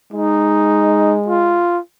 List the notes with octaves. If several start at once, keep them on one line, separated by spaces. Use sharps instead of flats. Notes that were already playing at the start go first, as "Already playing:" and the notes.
G#3 D#4
F4